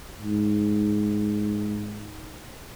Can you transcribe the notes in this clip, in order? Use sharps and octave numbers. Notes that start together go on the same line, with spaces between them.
G#2